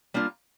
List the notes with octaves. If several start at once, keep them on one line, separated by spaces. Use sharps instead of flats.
G3 A#3 D4 F4